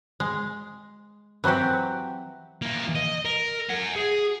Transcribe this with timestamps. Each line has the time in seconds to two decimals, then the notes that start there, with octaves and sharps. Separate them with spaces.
0.20 G#3
1.44 E3 F#3 C4 F#4 G4
2.62 E3 A#3
2.95 D#5
3.25 A#4
3.69 F#5 G#5
3.96 G#4